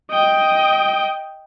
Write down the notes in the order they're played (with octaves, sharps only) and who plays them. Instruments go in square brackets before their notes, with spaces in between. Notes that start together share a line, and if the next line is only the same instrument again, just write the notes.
[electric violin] D#5 G5